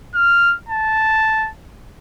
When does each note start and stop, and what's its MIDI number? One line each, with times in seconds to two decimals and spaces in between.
0.15 0.55 89
0.68 1.49 81